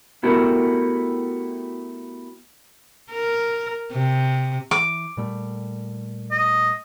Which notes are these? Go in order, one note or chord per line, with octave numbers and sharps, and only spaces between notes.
A3 B3 E4 F#4 G4 A#4
A#4
C3
E3 D6
A#2 G3 A3
D#5